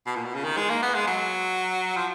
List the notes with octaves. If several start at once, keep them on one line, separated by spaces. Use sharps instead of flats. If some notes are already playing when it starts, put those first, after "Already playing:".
B2
A#2
B2
C#3
D#3
G#3
A#3
B3
G#3
F#3
F3